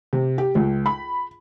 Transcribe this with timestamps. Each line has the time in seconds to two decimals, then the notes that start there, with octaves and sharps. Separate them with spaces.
0.13 C3
0.38 G4
0.55 C#2
0.86 B5